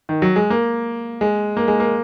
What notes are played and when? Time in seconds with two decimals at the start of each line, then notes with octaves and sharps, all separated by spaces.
0.09 D#3
0.22 F#3
0.36 G#3
0.50 A#3
1.21 G#3
1.57 A#3
1.68 G#3
1.80 A#3